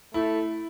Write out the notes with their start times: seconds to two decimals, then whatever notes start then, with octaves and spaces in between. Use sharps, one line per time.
0.14 A3 E4